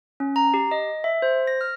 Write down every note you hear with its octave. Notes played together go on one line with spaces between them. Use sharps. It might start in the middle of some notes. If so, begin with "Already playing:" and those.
C#4
A#5
G4
D#5
E5
C5
A#6
F6